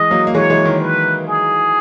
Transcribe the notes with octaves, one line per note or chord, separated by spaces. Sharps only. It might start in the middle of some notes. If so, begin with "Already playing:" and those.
Already playing: E3 G#3 D#5
F#3 A#3
A#3
E3 G#3 C#5
E3 G#3
D#3
B4
G#4